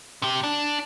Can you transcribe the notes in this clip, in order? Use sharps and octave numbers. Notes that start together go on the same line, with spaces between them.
C3 G4
D4